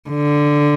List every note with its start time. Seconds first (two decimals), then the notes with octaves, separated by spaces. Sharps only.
0.10 D3